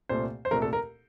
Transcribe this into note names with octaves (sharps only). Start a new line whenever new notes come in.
C2 A#2 A3 C5
C5
C2 A#2 A3 A#4
A4
A#4